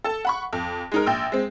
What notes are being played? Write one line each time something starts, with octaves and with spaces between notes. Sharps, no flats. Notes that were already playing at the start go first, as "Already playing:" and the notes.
A4 A5
F#5 B5 C#6
F2
G#3 D#4 A#4
A#1 G5 E6
G#3 C4